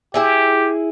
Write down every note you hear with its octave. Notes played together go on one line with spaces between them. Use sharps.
E4 G4 G#4 E5